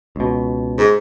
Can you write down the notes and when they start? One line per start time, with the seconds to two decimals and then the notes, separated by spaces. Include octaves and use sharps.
0.16 C#2 B2
0.78 G#2